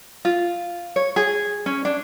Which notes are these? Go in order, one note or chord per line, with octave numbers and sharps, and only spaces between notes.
F4
C#5
G#4
C#4
D4